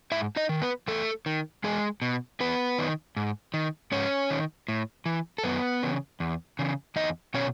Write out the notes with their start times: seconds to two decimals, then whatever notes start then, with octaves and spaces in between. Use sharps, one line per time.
0.12 G#2 E4 E5
0.36 D#4 D#5
0.49 D#3
0.62 B3 B4
0.88 E2 A3 A4
1.26 D#3
1.64 E2 G#3 G#4
2.02 B2
2.40 E2 B3 B4
2.79 D#3
3.16 G#2
3.54 D#3
3.92 G#2 C#4 C#5
4.30 D#3
4.68 A2
5.06 E3
5.38 A4
5.44 F#2 B3 B4
5.83 C#3 E3
6.20 E2
6.59 C#3 E3
6.96 E2 D#4 D#5
7.34 B2 C#4 C#5